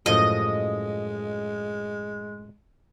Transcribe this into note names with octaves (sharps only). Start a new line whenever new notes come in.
F#2 A2 F3 G#3 D#5